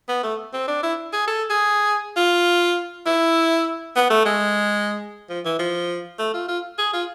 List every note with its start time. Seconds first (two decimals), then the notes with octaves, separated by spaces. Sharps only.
0.08 B3
0.23 A3
0.53 C4
0.67 D4
0.83 E4
1.13 G#4
1.27 A4
1.50 G#4
2.16 F4
3.06 E4
3.96 B3
4.10 A3
4.25 G#3
5.29 F3
5.45 E3
5.59 F3
6.19 A3
6.34 F4
6.48 F4
6.78 G#4
6.93 F4